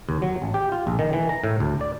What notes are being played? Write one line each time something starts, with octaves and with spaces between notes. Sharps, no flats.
D#2
F#3
A1
G4
F4
A#1
D#3
E3
A#5
A2
D2
D5